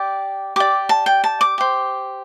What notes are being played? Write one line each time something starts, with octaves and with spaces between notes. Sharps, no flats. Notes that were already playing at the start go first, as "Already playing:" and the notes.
Already playing: G4 D5 G5
G4 D5 D6
A5
G5
A5
D6
G4 C5